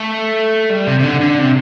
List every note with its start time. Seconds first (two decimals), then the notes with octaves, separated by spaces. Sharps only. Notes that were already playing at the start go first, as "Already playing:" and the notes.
Already playing: A3
0.70 G3
0.87 C3
0.99 C3
1.04 D3
1.21 D3
1.38 C3